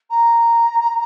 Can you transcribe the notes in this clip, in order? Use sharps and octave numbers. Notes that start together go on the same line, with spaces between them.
A#5